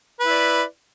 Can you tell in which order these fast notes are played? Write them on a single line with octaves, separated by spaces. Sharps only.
B4 E4 D5